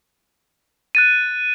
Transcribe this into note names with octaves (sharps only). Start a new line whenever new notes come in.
F#6 A6 D#7